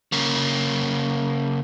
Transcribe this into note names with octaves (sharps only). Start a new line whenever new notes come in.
C#3 A#3